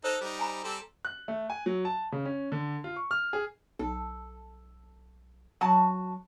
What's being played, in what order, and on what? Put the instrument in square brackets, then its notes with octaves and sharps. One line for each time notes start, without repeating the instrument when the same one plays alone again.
[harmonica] D#4 A4 [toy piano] C5
[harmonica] G3 D#4
[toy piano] G#5 A#5 B5
[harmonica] G3 C4 A4
[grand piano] F#6
A3
G#5
F#3
A5
C#3
C#4
D3
F4
C#6
F6
G#4
[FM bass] B1 [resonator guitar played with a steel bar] A4
[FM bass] F#3 [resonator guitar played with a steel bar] F#4 A5